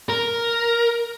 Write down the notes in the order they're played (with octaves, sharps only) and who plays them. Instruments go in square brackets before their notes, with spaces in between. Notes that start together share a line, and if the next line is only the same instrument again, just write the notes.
[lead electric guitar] A#4